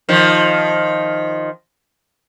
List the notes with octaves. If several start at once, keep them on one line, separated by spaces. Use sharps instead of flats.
D#3 F3